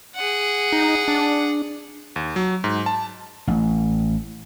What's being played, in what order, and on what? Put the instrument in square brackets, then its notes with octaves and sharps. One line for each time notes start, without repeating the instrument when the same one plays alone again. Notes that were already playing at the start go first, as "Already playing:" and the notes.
[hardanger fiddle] G#4 F#5
[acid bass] D#4
D4
[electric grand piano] D#2
F#3
G#2
A5
[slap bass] A1